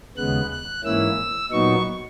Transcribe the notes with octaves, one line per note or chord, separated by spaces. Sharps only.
D#2 C#3 G#3 B3 F#6
F#6
G#2 E3 A#3 C#4 E4 E6
A#2 F#3 B3 D#4 C#6